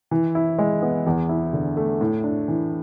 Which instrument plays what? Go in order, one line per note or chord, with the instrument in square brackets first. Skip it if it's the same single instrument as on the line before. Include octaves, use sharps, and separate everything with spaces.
[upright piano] E3
E4
G#3
B3
E2
E4
D3
A3
A2
D4
E3